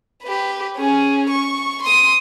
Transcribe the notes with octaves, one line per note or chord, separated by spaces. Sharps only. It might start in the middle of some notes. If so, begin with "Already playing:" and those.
G4 B4
C#4 G#4
C#6
C6 D#6